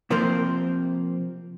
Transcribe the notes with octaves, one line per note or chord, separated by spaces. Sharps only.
C3 F3 A#3 C4 A#4 C5